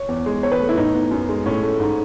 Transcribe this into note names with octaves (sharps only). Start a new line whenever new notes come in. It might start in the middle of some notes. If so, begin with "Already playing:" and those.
Already playing: C#5
E2
G#3
E2 C#5
B4
A3
E4
A2 D#4
B3
F#2
G#3
A2 C#4
A3
G#2